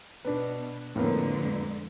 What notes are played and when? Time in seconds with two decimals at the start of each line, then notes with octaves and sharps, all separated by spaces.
0.25 B2 D4 B4
0.96 F2 A2 D3 G#3 A#3 B3